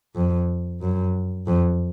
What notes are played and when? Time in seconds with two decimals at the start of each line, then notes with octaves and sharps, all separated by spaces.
0.15 F2
0.81 F#2
1.47 F2